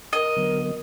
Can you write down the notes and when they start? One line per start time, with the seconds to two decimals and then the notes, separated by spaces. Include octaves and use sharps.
0.13 A#4 D#5
0.37 D3 F#3 B3